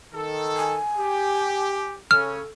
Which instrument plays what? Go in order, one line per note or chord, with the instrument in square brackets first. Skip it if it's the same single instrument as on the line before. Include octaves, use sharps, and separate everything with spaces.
[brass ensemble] D#3 A4
[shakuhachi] G#5
[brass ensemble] G4
[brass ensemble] C#3 C#4 [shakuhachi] A4 [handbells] F6